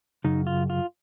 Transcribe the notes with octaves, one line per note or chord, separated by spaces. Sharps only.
F#2 C#3 D#4
F4
F4